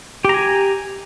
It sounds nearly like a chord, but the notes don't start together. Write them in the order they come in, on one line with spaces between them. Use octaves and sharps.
G4 A#5 G#5